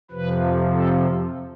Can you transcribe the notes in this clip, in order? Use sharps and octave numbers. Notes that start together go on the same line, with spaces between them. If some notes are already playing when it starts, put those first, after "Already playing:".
F2 C3 F3 B4
A4